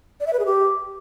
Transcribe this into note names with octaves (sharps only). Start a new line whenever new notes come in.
D5
E5
B4
G#4
G4